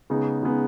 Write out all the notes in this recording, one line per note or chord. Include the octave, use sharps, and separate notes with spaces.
C#3 G#3 B3 D#4
C#3 G#3 B3 D#4